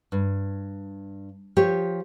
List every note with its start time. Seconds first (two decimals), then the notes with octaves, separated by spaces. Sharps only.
0.12 G2
1.57 F3 G4 C#5